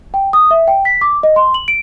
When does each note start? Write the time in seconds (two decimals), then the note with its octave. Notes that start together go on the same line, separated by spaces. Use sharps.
0.14 G5
0.33 D#6
0.51 E5
0.68 G5
0.85 B6
1.01 D6
1.23 D#5
1.36 C6
1.54 F#7
1.68 D7